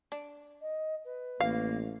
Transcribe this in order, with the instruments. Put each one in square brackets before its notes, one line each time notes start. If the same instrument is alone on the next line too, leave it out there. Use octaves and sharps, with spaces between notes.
[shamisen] D4
[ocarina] D#5
B4
[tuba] A1 [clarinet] A#3 [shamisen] F5